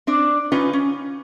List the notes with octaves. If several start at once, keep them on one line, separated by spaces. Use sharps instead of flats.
C4 D4 D5
C#4 D#4 F4 B4 G#5
C#4